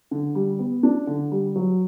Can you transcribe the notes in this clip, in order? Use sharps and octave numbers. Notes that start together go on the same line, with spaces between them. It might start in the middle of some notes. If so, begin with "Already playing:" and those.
D3
G3
B3
D4
D3
G3
F#3